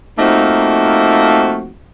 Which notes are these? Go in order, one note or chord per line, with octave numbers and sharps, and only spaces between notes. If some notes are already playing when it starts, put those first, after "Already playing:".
F3 A3 A#3 C4 D#4 F#4